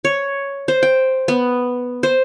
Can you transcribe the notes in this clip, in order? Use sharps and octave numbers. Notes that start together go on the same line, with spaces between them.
C#5
C5
G5
B3
C5